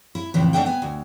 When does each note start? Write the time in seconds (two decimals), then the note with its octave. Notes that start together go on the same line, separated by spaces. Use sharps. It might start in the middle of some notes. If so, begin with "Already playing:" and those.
0.15 E4
0.34 F2 A2 C#3 E3
0.53 A3 D4 D#4 E5 F#5 G5
0.66 B3 G#5
0.82 D2